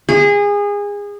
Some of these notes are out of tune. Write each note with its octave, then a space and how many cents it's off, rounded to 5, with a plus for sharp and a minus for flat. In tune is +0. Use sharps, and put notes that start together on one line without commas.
G#4 -25